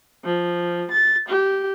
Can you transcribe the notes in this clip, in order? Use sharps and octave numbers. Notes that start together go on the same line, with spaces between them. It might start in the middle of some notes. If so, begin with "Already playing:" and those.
F3
A6
G4